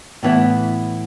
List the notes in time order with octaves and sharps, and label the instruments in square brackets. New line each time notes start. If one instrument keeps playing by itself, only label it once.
[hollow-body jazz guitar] A2 E3 B3 E4